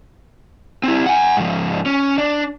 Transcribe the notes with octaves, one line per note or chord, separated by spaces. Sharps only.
C4 E4
F#5 G#5
G#2 F3
C#4
D4